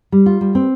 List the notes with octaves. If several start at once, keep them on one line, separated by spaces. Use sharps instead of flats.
G3
F4
G3
C4